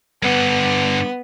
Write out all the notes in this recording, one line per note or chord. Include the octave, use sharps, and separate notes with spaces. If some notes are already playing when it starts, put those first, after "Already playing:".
G2 D3 B3